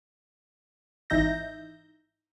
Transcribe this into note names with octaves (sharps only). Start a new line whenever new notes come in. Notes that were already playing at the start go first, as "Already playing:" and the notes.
G#1 E3 D#4 E5 G6 A#6